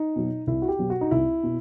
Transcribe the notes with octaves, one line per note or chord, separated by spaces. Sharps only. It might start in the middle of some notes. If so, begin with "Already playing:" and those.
Already playing: D#4
B2 F#3
C2 E4
F#4
G4
B2 F#3
F#4
D#4
C2 E4
B2